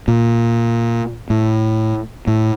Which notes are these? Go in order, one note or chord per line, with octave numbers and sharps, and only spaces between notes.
A#2
A2
A2